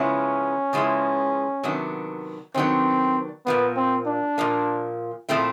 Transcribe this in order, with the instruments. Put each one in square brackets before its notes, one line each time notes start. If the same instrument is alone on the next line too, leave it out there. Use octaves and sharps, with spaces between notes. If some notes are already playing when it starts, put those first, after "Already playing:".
Already playing: [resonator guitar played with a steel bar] C#3 F3 G#3 B3 E4 [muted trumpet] C#4
[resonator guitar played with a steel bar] C#3 F3 G#3 B3 E4
C3 D#3 F#3 B3 D4
[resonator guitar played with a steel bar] C3 D#3 F#3 B3 D4 [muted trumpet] C4
[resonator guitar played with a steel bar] A#2 F3 A#3 [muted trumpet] B3
[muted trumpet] C4
D4
[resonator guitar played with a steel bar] A#2 F3 A#3
A#2 F3 A3 C4 E4